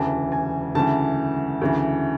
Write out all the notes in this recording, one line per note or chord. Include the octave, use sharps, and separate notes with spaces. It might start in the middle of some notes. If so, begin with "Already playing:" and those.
Already playing: E1 D2 C#3 E3 A5
G#5
D2 C#3 E3 A5
D2 C#3 E3